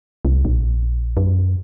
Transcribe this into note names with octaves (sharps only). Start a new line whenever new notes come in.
C2
A#1
F#2